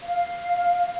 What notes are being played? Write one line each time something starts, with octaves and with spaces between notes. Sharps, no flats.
F5